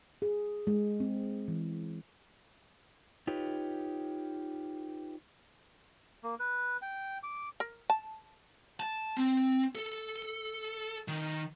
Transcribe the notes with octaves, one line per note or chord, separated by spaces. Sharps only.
G#4
G#3
C4
E3
D#4 F4 G4 B4 C#5
A#3
B4
G5
D6
A#4
A5
A5
C4
A4
D#3